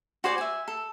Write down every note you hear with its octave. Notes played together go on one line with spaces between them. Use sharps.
F#4 C5 D5 G#5
E5 G#5
A4